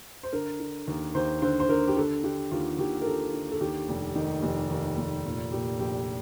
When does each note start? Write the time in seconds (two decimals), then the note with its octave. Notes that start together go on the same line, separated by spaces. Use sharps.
0.23 C5
0.33 D3 A#4
0.60 D3
0.87 D#2
1.15 D#2 C5
1.42 D3 C5
1.60 C5
1.69 D3 A#4
1.88 G4
1.97 D3 A4
2.24 D3 G4
2.51 D#2 F4
2.78 D#2 G4
3.01 A#4
3.06 D3 A4
3.33 D3
3.51 A4
3.61 D#2 G4
3.88 F1
4.15 D#3
4.43 F1
4.70 D#2
4.97 F1
5.25 A#2
5.52 A#2 G4
5.79 A#1 G4